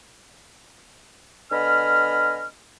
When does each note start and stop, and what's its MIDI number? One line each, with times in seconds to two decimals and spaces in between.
1.51 2.46 50
1.51 2.46 59
1.51 2.46 75
1.51 2.46 80
1.51 2.46 83
1.51 2.46 89